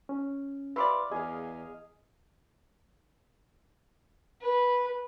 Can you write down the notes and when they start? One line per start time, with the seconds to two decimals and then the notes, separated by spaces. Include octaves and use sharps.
0.09 C#4
0.76 E4 G4 B4 D5 F5 C6 D6
1.11 E2 G#4 D#5 F5
4.41 B4